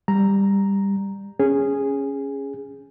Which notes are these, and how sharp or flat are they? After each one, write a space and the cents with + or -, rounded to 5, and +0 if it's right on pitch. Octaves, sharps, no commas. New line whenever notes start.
G3 +15 A#5 +0
C#4 +0 G#4 -10